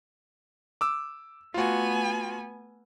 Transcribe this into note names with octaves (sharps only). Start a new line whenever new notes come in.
D6 E6
A3 B3 F4 F#4 G#5